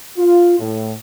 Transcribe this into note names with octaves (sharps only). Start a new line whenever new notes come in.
F4
A2